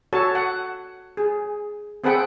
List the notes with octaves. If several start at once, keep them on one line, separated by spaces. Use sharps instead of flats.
F#4 A4 C#5 A5
F#5
G#4
C4 G#4 A4 B4 F#5 G5